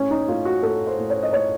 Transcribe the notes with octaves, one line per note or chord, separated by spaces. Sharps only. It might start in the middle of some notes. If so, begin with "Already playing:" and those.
Already playing: A2 C#4
D#4
A2 F4
F#4
A2 A4
C5
A2
C#5
D#5
A2 C#5